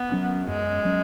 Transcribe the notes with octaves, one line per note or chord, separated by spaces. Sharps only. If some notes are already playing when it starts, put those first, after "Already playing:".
Already playing: B3
F#3 C#4
F#2 G#3
F#3 C#4